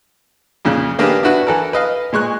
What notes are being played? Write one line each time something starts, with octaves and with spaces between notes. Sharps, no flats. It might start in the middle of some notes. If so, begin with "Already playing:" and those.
F2 A#2 C#3
D#3 A#3 D4 G4 G#4 B4
D4 E4 F#4 B4
E3 A4 A#4
B4 D#5 F5
A#2 G#3 C#6 F#6